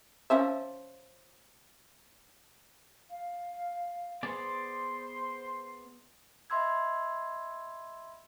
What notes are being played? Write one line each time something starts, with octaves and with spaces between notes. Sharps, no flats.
F3 C#4 E5
F5
B3 G#4 C5 D5 C6
D#5 E5 B5 C6 E6 G#6